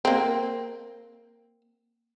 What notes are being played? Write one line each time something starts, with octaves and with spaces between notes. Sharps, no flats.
A#3 C4